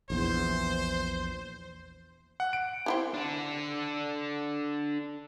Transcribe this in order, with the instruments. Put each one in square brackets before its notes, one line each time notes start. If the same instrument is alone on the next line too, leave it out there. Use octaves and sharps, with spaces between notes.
[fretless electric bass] A#1 E2 [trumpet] C5
[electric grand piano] F#5
D7
[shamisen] C4 E4 G4
[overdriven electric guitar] D4 A4